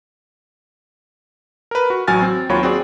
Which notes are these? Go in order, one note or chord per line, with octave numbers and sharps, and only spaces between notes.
A#4 B4
F#4
A1 F#3 F#4 G#5 F6 A6
C4
D#2 F#3 F4 C#5 B5
C4 F#4 G#4 D5